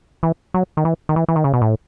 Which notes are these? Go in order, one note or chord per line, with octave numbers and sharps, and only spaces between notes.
E3
F#3
D#3
E3
D#3
E3
E3
D#3
C#3
B2
A2